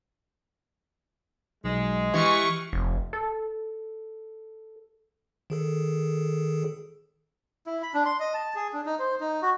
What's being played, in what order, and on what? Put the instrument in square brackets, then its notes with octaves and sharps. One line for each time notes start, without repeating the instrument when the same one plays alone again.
[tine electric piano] B1 [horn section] G#3
[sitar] E3 [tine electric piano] G4 F6 [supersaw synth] C#6
[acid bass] F1
A4
[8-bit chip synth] D#3 G#4 A4
[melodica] E4
B5
D4
C6
D#5
A5
G#4
D4
D#4
C5
D#4
F#4